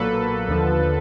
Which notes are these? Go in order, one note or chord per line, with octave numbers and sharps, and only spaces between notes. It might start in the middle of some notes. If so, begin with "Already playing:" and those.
Already playing: B1 A#2 F#3 A#3 A4 B4
D#2 D3 F3